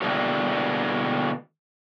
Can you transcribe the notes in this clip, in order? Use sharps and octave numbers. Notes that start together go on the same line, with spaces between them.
B2 D3 E3 G3 G#3 A#3